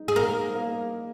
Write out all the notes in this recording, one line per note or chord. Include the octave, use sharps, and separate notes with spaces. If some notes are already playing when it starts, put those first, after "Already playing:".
Already playing: D#4
G#4
A#3 A#4
A#3